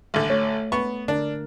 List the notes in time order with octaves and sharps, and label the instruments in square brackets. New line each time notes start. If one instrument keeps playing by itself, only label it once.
[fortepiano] A1 D3
[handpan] A3 [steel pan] C#5
[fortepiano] B3 C#6
[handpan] D3 A#4 [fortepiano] D4